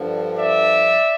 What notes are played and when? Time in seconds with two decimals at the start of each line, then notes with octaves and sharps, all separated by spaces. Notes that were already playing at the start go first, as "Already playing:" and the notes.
Already playing: G2 D3 F3
0.37 D5 E5